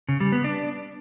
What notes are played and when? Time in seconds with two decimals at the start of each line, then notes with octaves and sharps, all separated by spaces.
0.09 C#3
0.20 G3
0.32 B3
0.44 D4